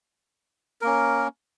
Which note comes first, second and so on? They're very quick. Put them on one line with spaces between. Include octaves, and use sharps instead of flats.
A#4 A#3 C#4